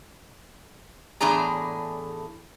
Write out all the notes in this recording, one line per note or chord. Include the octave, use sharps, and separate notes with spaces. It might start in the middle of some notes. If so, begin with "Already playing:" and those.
E2 A2 D4 G#4 A#5